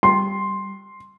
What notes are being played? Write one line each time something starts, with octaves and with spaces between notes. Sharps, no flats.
G3 C6